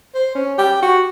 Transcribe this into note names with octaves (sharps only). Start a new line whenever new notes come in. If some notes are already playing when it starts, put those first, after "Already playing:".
C5
C#4
G4
F#4